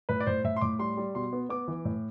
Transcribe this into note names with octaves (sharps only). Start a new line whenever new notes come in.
A2 B4
D5
A2 C5
A2 E5
C6
A2 D6
G3 C6
G3
B2 C6
B3
B3 D6
E3
A2